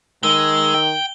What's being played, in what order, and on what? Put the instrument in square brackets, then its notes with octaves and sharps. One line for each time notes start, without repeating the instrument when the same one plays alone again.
[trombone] D#3 [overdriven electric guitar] G#3 [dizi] E6 [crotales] G7
[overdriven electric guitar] G5